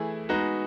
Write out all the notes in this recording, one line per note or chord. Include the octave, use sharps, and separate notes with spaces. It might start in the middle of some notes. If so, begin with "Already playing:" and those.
Already playing: E3 A3 E4 G#4
G#3 B3 D#4 F#4